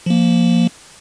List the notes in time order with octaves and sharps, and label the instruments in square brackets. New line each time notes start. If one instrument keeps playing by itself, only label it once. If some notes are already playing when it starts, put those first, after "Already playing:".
[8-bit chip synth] F3 A#3